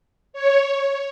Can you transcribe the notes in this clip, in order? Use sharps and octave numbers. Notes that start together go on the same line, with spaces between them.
C#5